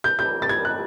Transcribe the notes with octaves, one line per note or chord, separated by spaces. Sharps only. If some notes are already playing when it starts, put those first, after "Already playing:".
G6
G6
A6
G#6
F#6